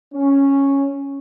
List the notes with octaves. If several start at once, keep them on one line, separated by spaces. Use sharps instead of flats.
C#4